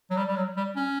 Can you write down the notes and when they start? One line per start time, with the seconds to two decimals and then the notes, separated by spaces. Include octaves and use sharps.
0.11 F#3
0.17 G3
0.28 G3
0.36 F#3
0.57 G3
0.76 C#4